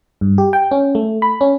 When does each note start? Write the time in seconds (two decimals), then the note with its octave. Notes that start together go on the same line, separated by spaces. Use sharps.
0.21 G2
0.38 G4
0.53 G5
0.71 C#4
0.95 A3
1.22 B5
1.41 C#4